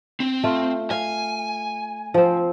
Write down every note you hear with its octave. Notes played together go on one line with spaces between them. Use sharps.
C4
A3 F4
F5 G#5
F3 C4